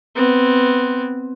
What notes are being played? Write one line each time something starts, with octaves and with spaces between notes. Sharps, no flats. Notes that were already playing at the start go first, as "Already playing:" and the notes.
B3 C4